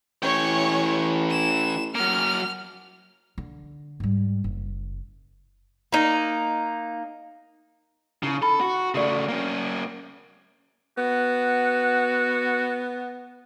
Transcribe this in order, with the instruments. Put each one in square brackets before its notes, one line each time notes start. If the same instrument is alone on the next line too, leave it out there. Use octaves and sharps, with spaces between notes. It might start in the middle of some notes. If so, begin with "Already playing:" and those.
[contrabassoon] A1 [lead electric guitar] E3 G5 [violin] C#5 C#6
[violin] E7
[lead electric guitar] F#3 A#3 [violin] F6
[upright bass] D3
G#2 G3
F#1
[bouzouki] A#3 D#4
[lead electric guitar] C#3 [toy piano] D#4 E4
[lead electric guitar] A4 [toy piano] B5
[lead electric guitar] F#4
[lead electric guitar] C#3 A3 [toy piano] F#4 D5
[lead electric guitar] A#3 C#4
[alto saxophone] B3 [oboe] F#4